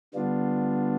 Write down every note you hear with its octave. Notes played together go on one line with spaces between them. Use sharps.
D3 G3 B3 D4 F4